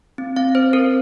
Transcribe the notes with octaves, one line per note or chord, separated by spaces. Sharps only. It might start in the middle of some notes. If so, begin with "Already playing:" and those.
C4
C4 F5
C4 C5
C4 A#4